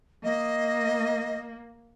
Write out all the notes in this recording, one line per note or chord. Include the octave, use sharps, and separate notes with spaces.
A#3 D#5